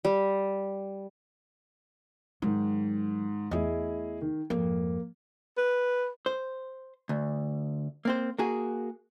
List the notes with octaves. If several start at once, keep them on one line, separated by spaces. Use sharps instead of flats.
G3
G#2 D#3 F#3
E2 A3 E4 G#4 D#5
D#3
G#1 F2 A#3
B4
C5
D2
A#3 C4 C5
A#3 F#4 G#4